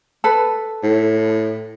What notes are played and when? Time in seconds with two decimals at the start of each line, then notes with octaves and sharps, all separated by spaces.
0.24 A4 B4
0.83 A2